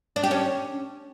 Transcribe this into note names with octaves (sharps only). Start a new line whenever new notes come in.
D4
G4
C#4